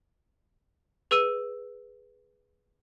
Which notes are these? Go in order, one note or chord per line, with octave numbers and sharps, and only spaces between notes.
G#4 B4 E6 D#7